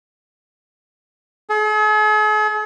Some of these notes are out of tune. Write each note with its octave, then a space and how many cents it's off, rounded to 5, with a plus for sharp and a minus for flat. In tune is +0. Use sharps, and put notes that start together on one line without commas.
G#4 +45